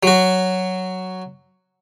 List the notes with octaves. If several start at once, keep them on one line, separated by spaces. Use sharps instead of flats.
F#3 F#4